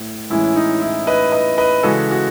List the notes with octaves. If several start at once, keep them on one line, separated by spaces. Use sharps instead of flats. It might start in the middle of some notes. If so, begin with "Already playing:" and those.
Already playing: A2 A3
A2 E3 G#3 C#4 E4
D#4
E4
B4 D#5
B4 D#5
B4 D#5
C#3 E3 G#3 C#4 F#4 A4
F#4